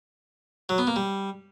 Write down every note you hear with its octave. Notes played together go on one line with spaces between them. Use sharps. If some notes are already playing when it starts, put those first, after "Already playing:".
F#3
B3
A#3
G3